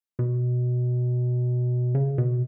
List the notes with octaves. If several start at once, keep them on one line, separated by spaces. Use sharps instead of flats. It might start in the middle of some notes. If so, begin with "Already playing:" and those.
B2
C#3
B2